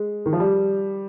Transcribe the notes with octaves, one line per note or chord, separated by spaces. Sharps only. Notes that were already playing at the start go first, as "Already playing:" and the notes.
Already playing: G#3
D#3
F3
G3